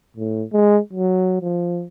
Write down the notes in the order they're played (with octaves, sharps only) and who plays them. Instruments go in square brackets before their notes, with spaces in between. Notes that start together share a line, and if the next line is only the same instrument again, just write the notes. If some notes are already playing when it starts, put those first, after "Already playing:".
[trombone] A2
G#3
F#3
F3